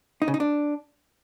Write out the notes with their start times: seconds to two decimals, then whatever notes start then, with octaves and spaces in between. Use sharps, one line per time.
0.22 D#4
0.28 C#3
0.34 D#4
0.40 D4